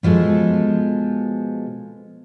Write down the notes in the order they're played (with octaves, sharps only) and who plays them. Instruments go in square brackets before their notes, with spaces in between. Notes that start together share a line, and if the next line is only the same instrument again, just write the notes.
[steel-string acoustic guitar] B2 F3 G#3 A4